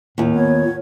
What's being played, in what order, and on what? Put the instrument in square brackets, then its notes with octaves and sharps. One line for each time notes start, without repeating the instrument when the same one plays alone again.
[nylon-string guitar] D#2 F4 [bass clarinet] A2
[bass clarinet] B3 [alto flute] C#5